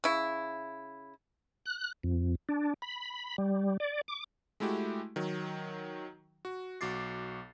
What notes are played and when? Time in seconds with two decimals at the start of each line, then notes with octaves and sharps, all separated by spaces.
0.04 C#3 E4
1.66 F#6
2.03 F2
2.49 D4
2.82 B5
3.38 G3
3.80 D5
4.08 D6
4.60 G#3 A3 E4 F#4 G4
5.16 D#3 F#3
6.45 F#4
6.81 B1 F#4 D6 A6 C7